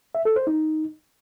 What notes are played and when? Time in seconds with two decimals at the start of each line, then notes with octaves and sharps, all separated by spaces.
0.15 E5
0.25 A4
0.36 C5
0.47 D#4